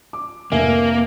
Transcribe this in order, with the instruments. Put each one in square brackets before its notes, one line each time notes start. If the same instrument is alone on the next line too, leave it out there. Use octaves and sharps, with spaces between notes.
[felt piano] D6
[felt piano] F1 E5 G#5 [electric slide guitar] A#3